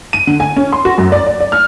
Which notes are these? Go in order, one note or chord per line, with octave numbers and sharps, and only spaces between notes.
D#7
D3
G#5
C#4
C6
F#4
F#2
D5
D5
D5
F6